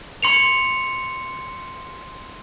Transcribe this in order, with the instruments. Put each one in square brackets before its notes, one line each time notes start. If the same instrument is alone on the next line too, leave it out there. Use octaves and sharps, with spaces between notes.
[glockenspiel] C6 C#7 F7